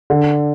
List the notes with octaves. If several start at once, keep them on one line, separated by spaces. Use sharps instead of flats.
D3